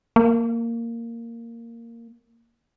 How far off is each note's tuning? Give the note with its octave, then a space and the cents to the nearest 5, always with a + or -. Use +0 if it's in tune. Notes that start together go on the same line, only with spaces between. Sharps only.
A#3 -10